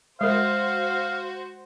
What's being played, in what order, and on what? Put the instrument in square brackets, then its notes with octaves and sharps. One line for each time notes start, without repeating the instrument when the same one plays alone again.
[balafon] G#3 A#4 [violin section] F#4 C5 [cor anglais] F5